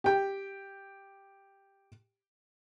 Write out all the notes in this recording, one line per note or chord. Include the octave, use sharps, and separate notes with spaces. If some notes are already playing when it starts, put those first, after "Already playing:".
G4 G5